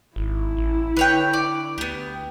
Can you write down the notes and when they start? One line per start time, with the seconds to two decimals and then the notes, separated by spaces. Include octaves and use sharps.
0.16 G#1 E4
0.57 A1
0.97 D3 B4 C#5 G5
1.33 D5
1.78 D2 B3 G4